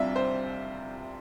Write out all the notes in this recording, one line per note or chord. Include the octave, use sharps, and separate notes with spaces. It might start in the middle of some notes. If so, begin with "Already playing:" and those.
Already playing: C2 C3 G3 D4 F4 E5
C5